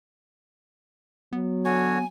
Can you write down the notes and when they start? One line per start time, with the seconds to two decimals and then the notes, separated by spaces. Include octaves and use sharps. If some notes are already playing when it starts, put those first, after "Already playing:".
1.33 F#3 B3
1.65 D3 F#4 C#5 G#5